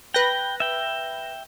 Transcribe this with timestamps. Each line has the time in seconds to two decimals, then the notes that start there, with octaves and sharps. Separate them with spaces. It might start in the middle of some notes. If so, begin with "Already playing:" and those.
0.14 B4 G5 F#6 A#6
0.60 E5 G5